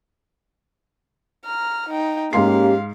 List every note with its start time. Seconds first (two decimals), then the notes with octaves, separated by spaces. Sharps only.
1.45 A#5 F6
1.89 D#4 G5
2.33 G#2 A#3 C#4 G4 F5 C6 C7